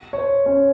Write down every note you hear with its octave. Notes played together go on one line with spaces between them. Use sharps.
C#5
C5
C#4 C#5